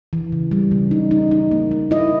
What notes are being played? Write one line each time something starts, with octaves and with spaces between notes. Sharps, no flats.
E3
C#3
G3
C#3
D#4
D#4
D#4
A#3
A#3
E4 D#5